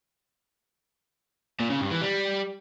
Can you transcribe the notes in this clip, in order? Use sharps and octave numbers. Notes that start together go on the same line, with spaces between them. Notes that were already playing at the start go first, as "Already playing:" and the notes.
A#2
C#3
G2
E3
G3